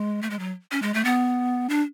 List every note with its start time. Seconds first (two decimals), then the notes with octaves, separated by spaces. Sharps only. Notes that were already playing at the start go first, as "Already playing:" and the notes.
Already playing: G#3
0.22 A3
0.30 G#3
0.39 F#3
0.72 C#4
0.82 G#3
0.94 A3
1.05 B3
1.69 D4